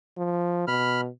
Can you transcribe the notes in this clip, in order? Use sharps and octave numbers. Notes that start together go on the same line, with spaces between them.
F3
B2 B5 F6